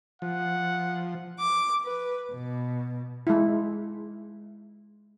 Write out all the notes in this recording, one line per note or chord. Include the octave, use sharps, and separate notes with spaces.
F3 F#5
D6
B4
B2
G#3 E4